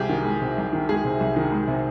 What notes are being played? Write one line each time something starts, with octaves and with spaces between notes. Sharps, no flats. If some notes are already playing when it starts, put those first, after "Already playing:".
Already playing: C2 C3 G#3 G4 G#4
D#3
G#3
C3
C2
D#3
G#3 G#4
C3
C2
D#3
G#3
C3